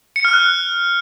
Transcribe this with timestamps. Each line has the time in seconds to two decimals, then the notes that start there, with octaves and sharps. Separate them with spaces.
0.16 C#7
0.25 F6
0.33 F#6